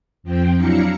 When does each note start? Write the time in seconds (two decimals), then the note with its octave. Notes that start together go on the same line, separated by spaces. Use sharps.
0.23 F2 F3 C4 G5
0.56 F#3 D4 E4 F5 A#5 C#7